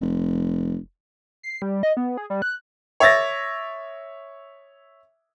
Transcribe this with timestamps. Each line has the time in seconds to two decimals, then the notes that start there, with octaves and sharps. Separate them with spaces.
0.01 F1
1.43 C7
1.62 G3
1.83 D#5
1.97 B3
2.17 G#4
2.30 G3
2.42 F#6
3.00 C#5 E5 A6 A#6